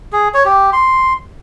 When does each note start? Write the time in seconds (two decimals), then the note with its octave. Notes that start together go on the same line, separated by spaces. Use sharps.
0.12 G#4
0.34 C#5
0.45 G4
0.73 C6